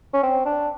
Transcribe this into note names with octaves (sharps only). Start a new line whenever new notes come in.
C#4
C4
D4